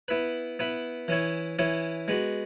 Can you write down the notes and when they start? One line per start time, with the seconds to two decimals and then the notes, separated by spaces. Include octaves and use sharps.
0.08 B3 E4 B4
0.59 B3 E4 B4
1.08 E3 C#4 E4 C#5
1.59 E3 C#4 E4 C#5
2.08 G#3 B3 F#4